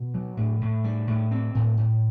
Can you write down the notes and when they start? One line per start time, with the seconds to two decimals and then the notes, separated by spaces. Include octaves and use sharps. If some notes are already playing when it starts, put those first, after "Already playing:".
Already playing: B2
0.14 F#3
0.37 A2
0.61 A2
0.84 G3
1.07 A2
1.31 C4
1.55 A2
1.77 A2